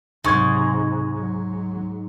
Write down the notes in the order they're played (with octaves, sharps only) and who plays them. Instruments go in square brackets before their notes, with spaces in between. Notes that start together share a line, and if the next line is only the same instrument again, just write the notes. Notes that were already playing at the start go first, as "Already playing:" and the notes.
[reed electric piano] C#2 C#6 G#6 [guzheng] G#2 [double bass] C3 F#3
[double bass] F#3